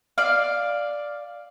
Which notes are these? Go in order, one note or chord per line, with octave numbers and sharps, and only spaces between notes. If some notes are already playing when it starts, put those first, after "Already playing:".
D5 F5